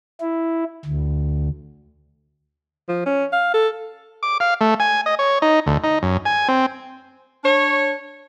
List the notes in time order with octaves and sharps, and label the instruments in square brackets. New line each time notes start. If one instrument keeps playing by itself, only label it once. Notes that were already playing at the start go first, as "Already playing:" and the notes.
[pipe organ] E4
D2
[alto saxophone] F3
C#4
F5
A4
[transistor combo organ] D6
F5
A3
G#5
D#5
C#5
D#4
D2
D#4
F#2
G#5
C4
[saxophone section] D4 C#5